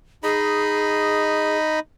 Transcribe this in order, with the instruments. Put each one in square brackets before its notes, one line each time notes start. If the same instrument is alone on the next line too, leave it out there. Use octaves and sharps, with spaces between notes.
[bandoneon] D#4 D#5 B5 [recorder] G#4